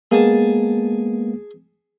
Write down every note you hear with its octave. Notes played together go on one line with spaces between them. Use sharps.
G#3 A#3 B3 G#4 G#5 A5